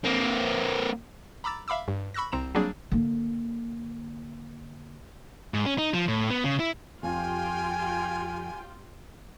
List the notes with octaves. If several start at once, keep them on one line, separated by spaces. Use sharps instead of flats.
A#3 C4
A#5 B5 D6 E6 A6
E5 F5 B5 D6 E6
G2
B5 C#6 E6 F#6 A#6
C2 C4 A#5 E7
F#3 G3 A#3 C4 D4 G#4
D3 A#3
G#2
C#4
D#4
F3
A2
B3
C#3
E4
F2 F4 G4 G5 G#5